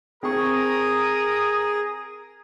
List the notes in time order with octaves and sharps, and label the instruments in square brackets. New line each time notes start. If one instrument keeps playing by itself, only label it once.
[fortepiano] C4 C#6 [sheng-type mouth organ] G#4 [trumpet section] A#4 A#5 D#6